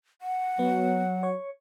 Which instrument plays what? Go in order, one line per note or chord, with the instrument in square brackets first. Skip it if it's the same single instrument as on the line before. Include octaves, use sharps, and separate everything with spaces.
[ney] F#5
[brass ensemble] F#3 [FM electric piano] B3
[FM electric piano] C#5 C#6